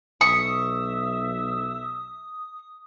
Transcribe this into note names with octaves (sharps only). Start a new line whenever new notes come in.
B1 E5 C#6 D#6